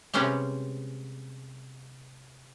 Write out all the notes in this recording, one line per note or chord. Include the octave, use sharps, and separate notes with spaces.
C3 G3 G#3 B3 C#4 G4